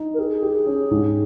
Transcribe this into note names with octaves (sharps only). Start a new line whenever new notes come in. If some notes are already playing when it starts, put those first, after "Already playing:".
Already playing: D#4
A#4
G4 G#4
G4
C#4
G#2